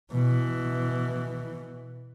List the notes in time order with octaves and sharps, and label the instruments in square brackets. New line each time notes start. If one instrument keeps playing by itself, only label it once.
[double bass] B2 E3